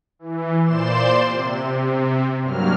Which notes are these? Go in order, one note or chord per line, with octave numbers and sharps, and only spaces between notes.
E3
A#2 C5 D5 C6 E7
C3
G2 F#3 G3 A#3 F6